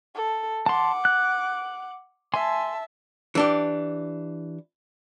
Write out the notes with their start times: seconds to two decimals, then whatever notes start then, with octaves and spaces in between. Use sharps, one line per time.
0.15 A4
0.66 F#5 A5 C6 D6
1.05 F#6
2.34 E5 G#5 A5 C6
3.35 E3 D4 G4